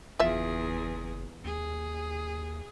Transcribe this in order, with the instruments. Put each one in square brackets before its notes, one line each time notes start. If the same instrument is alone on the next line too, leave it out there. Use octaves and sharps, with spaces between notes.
[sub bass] F#1 [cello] E2 G#4 [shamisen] F4 E5
[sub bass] D#2 [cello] G#4